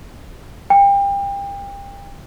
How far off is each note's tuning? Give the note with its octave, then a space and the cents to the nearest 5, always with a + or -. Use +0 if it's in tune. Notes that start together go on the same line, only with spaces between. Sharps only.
G5 +30